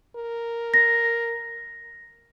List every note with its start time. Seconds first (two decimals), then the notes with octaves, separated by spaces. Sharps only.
0.16 A#4
0.74 A#6